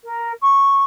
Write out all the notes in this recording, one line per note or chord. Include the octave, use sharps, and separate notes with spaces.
A#4
C#6